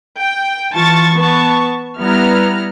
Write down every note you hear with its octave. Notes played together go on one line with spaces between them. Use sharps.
G5
E3 F4 A5 C#6 A6
B3 A5 C#6
G3 B3 E4 A#5 F6